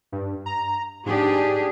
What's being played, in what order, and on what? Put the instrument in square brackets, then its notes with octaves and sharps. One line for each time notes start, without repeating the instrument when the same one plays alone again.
[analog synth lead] G2
A#5
[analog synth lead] G#2 [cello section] D4 G4 G#4